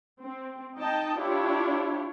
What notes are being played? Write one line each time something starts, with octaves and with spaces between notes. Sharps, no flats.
C4
D#4 D#5 G5 A5
D4 E4 F4 G4 C#5